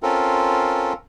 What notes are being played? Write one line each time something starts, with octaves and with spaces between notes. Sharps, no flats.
C4 C#4 F4 A4 A#4